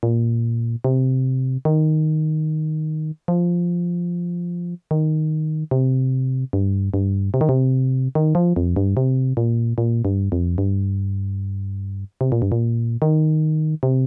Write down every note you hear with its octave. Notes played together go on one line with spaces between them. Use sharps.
A#2
C3
D#3
F3
D#3
C3
G2
G2
C3
D#3
C3
D#3
F3
F2
G2
C3
A#2
A#2
G2
F2
G2
C3
A#2
G2
A#2
D#3
C3